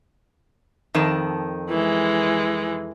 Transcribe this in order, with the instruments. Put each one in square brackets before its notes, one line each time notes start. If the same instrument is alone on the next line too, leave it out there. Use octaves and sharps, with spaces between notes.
[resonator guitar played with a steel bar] F2 D#3 A5
[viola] E3 G#3